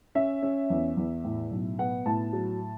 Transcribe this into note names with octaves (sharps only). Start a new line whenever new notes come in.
C#4 E5
C#4
E2
E2
A2
B1
B3 F#5
A2 A5
F#3